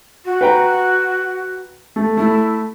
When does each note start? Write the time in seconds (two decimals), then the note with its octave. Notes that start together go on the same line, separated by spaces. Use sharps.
0.25 F#4
0.41 B4 G5 A#5
1.96 A3
2.17 A3 E4